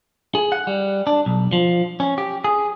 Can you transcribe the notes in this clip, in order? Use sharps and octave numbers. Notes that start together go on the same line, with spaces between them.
G#4
F#5
G3
D4
B1
F3
C#4
G4
G#4